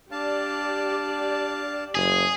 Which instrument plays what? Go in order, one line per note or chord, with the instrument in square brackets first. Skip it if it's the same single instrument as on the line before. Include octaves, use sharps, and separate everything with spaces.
[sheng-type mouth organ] D4 F5 A5 [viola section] G4 D5
[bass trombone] F#1 [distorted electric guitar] G#4